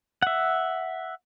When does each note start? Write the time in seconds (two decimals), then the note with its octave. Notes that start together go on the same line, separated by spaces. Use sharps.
0.22 E5 F#5